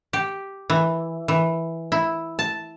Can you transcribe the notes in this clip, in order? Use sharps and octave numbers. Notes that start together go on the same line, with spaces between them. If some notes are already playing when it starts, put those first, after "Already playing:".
G4
E3
E3
E4
A5